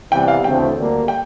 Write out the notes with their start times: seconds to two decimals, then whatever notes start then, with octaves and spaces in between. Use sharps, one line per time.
0.12 C3 E3 G3 B3 G5
0.28 F5
0.44 D2 C#3 E3 A3 C4 G5
0.76 D2 D3 G3 A#3
1.08 G5